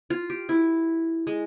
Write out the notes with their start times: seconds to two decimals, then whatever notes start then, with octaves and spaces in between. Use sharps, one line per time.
0.10 F4
0.30 G4
0.49 E4
1.27 G#3